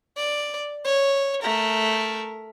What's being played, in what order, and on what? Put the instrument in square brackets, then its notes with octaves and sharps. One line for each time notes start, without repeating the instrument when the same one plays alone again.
[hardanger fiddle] D5
C#5
A3 A#4